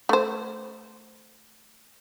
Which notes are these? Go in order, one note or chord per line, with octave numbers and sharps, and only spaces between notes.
A3 C5